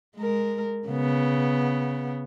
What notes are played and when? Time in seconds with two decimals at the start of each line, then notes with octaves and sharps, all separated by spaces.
0.17 G#3 A#4
0.88 C#3 B3